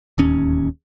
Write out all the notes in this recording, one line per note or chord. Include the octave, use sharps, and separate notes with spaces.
D1 D#2 C#4